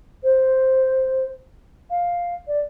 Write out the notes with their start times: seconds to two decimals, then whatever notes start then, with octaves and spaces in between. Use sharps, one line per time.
0.23 C5
1.90 F5
2.47 D5